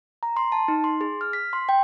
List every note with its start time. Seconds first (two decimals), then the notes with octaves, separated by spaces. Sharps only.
0.23 A#5
0.37 C6
0.52 A5
0.68 D#4
0.84 C6
1.01 G#4
1.21 F6
1.33 B6
1.53 C6
1.69 G5